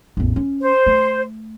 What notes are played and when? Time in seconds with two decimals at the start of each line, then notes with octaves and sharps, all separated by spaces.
0.17 A1 E2
0.36 C#4
0.60 C5
0.86 A3